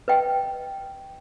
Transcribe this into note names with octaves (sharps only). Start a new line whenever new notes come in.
B4 D#5 G5